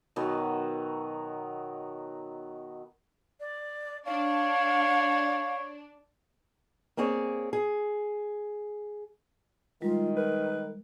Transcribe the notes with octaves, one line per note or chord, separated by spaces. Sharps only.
B2 D#3 F#3 B3
D5
D4 C#5 F5
A#3 C4 G#4 C#5 D5
G#4
D#3 G3 G#3 F4
A#4 B4